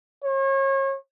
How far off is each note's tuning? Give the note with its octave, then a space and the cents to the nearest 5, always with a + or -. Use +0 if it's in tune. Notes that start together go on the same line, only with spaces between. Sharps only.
C#5 -35